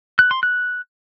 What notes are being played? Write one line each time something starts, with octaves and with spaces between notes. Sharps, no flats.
F#6
C6
F#6